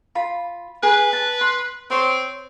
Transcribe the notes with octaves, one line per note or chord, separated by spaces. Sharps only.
F4 B5
G#4 B4
A5
C6
C4 C#5 C6